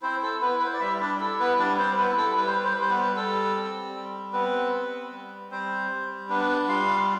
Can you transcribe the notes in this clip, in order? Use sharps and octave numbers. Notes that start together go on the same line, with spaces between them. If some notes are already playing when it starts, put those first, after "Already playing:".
C4 E4 C5
A4
B3 E4 B4
B4
C5
D5
G3 E4 E5
D4 D5
E4 A4
B3 B4
G3 D4 D5
C4 C5
B3 E4 B4
A4
G3 B4
C5
B4
C5
B4
G3
C5
B3 B4
G3 A4
C4
G3
B3 C4 B4
C4
G3
G3 C4 C5
G3
B3 D4 B4
G3 F4 F5